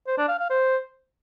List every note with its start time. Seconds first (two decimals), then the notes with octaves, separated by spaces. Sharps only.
0.07 C5
0.18 D4
0.29 F5
0.39 F5
0.50 C5